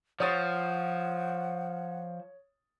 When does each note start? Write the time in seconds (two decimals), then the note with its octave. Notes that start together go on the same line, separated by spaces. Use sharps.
0.20 F3 C#5 F#5 D#6 A6